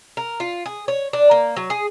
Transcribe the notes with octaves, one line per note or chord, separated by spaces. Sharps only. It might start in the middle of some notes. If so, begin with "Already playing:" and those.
A#4
F4
G#4
C#5
D4
A#3
F#3
G#4